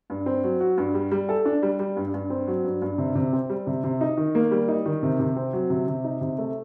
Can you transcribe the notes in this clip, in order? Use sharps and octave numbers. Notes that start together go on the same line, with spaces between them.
G2
C4
F#3
F#4
G2
G3
G3
A4
D4
G3
G3
G2
G2
C4
F#3
G2
G2
C3
C3
C4
G3
C3
C3
D#4
D#3
A#3
G3
D#4
D#3
C3
C3
C4
F#3
C3
C3
D#4
C3
A3